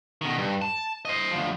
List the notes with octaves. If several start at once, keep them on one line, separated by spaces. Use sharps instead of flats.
B2 D#3
G2
A5
C5 D#5
D2 F3